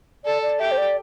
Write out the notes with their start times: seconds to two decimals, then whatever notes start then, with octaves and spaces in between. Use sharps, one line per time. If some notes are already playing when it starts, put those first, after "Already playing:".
0.25 A4 D5
0.42 D5
0.59 G4 E5
0.72 C5
0.78 D5